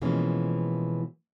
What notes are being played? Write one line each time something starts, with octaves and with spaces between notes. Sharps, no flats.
B2 E3 F3 G#3 A#3 C#4